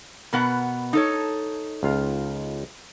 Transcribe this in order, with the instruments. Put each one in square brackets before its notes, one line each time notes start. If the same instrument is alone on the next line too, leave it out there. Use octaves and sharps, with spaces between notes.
[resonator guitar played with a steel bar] B2 B3 F#5 [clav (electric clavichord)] A#4
[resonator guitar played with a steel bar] D#4 A4 C#5
[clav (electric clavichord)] C#2 F4 F5